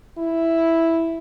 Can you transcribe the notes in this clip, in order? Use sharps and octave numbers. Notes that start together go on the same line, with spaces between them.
E4